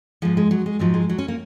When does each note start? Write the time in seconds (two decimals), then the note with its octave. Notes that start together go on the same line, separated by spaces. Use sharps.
0.22 G#2 F3 G#3
0.37 G#3
0.51 F#3
0.66 G#3
0.79 G#2 F3 F#3
0.94 G#3
1.09 F#3
1.18 C#4
1.28 A#3